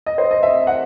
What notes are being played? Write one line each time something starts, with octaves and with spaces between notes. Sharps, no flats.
D#5
C5
D#5
E5
F#5